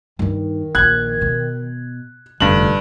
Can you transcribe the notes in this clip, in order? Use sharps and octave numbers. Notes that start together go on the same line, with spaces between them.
G2 D#3 D#4
A#1 A#2 F#6 G#6
B2
F1 G2 D3 F#7